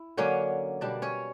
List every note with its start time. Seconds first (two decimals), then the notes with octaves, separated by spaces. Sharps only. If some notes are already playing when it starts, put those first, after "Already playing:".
Already playing: E4
0.17 D3 F#3 A#3 C#4 C#5
0.81 B2 G3 A#3 D4 D5
1.02 C#4 C#5